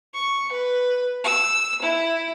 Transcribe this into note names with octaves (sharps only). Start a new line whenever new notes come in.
C#6
B4
E6
E4